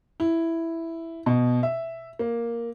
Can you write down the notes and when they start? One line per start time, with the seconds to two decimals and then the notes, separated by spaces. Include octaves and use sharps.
0.20 E4
1.26 B2
1.63 E5
2.19 A#3